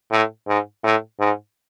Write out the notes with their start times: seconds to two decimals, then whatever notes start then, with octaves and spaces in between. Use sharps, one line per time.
0.11 A2
0.47 G#2
0.84 A2
1.20 G#2